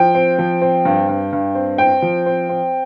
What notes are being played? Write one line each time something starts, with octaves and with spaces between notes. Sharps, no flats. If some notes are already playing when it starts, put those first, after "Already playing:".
Already playing: F3 G5
C4
F3
C4
G2
G2
G2
C4
C4 G5
F3
C4
C4